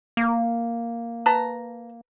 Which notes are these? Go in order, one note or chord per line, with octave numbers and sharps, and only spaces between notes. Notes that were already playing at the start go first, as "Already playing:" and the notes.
A#3
B4 A5 A#5